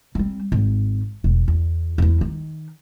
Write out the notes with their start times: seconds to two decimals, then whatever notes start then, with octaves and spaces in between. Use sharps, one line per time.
0.15 G3 C4
0.52 G#1
1.24 E1
1.48 E2
1.98 E2 E4
2.21 D#3